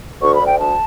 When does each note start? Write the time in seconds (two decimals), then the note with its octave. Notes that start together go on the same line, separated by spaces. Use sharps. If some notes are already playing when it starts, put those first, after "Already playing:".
0.22 D2 C#6
0.35 B5
0.41 D2
0.46 G5
0.59 D2 A5